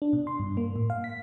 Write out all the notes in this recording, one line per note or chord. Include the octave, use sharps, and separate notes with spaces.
D4
B2
C6
G2
A#3
A2
F5
B6